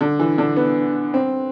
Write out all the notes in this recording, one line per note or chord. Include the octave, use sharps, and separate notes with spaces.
D3
E3
D3
B3
C4